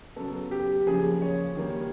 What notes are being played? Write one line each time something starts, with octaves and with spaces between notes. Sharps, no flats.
C#3 F#3 B3 A4
G4
C#3 F3 A#3 G#4
C#5
D#3 G3 A#3